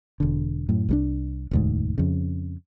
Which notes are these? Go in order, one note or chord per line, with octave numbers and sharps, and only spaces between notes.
E1 D3
F#2 A2
C2 G3 D4
E1 D2 G#2
F2 C#3